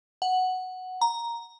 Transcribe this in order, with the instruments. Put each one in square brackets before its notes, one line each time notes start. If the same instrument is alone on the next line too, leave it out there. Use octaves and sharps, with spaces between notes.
[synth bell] F#5
A#5